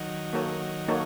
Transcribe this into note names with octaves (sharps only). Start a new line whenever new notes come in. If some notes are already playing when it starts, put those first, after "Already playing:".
Already playing: D#3 F#3
A#3 D#4 F#4 A4 C#5
A#3 D#4 F#4 A4 C#5